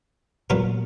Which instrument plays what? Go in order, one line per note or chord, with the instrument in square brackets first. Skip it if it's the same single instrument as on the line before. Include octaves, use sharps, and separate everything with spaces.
[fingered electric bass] A#2 [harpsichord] F#3 B3 F4 A#4